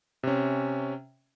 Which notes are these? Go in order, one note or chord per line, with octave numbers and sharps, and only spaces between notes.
C3 C#4